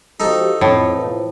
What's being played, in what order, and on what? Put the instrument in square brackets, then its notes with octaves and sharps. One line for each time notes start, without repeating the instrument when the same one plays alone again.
[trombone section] F3 F#4 G4 [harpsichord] D#4 A4 C#6
[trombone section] F2 [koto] A2
[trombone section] E3 F3